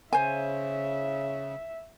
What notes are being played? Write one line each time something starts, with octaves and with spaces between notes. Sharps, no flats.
C#3 C5 E5 G#5